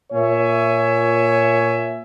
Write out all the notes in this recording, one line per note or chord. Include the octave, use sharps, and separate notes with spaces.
A#2 C#5 E5 G#5